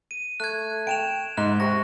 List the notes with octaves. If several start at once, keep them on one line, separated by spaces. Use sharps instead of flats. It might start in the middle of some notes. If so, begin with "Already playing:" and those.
D#7
A3 F#6 G#6
G5 D7 E7 F7
G#2 D#4 F#6
C3 C#6 A#6